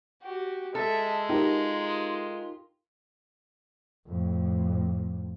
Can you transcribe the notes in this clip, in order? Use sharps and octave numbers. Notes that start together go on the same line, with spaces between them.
F#4 G4
G#3 A4 E5
D#4 F4 G4 A#4
F2 A2